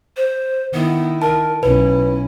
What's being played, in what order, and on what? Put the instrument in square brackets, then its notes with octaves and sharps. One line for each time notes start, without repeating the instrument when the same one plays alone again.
[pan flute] C5
[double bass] D#3 E4 [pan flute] B3
[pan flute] A#4 [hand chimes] A5
[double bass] B1 C#4 [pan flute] E4 [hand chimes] B4